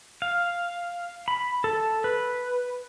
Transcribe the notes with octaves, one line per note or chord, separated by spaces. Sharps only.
F5
B5
A4
B4